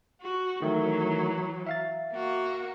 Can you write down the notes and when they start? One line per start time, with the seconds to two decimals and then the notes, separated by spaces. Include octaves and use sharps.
0.22 F#4
0.62 D#3 E3 F#3 A3
1.66 E5 F5 A6
2.14 A#3 F#4